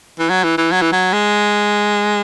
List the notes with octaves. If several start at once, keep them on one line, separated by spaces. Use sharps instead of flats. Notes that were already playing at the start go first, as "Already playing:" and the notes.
E3
F#3
E3
E3
F#3
E3
F#3
G#3